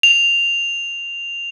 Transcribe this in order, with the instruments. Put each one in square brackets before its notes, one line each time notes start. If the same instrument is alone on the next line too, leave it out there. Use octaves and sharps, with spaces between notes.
[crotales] F7